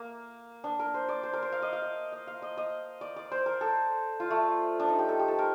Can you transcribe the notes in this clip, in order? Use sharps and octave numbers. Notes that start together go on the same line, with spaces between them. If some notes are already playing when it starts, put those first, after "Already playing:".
Already playing: A#3
D4
A#4
C5
D5
C5
A#4
C5
F5
D#5
F5
D#5
D#5
F5
D#5
D#5
D5
D5
C5
A#4
A4
F4
A3
D4
D#4
G4
A4
G4
A4
A#4